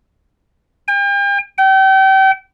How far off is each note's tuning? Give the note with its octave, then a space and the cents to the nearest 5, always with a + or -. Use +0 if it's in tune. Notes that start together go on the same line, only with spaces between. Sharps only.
G5 +40
G5 -35